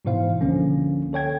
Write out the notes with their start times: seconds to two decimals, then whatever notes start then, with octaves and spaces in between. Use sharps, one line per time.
0.05 G#2 B2 E3 E4 C5 F5
0.41 C#2 D3 F3 A#3 C#4
1.13 A4 C#5 G5 G#6